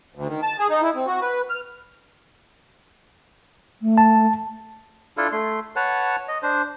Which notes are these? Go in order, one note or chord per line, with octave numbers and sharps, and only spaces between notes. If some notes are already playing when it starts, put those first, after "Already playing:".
D2
D#3
A5
G#4
D#4
E4
C4
F#4
B4
F6
A3
A5
D4 E4 F4 A4
A3 C6
B4 C#5 F#5 A5
D#5
D4 C5